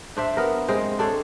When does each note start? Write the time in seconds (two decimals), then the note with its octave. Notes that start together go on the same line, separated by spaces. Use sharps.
0.17 D4 C5 E5
0.37 B3 A#4
0.68 G#3 C4 C5
0.99 D4 A4 C5 C#5